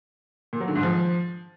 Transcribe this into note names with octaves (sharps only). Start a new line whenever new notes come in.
A#2
F#3
D3
G#2
F3